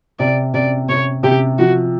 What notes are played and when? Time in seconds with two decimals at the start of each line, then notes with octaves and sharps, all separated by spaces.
0.19 C3 D5
0.54 C3 D5
0.89 C3 C#5
1.23 C3 G4
1.58 F3 F#4